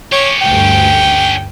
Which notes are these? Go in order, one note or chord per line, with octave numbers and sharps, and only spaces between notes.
C#4 G4 C#5
D2 G2 G5